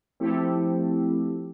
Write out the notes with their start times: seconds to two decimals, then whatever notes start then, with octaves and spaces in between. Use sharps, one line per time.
0.20 F3 A3 C4 E4 G4 A4